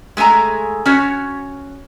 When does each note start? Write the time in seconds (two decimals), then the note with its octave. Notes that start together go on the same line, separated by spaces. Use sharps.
0.17 G#3 A3 A4 G#5 A#5
0.86 C#4 F#4 C#5